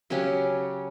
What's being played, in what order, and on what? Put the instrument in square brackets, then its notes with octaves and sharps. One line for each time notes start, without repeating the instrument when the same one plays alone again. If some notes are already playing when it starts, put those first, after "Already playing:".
[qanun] C#3 F#3 C#4 G4